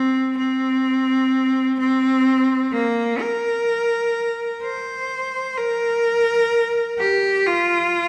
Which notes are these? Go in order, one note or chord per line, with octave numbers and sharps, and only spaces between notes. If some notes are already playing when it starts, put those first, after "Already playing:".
Already playing: C4
C4
C4
A#3
A#4
C5
A#4
G4
F4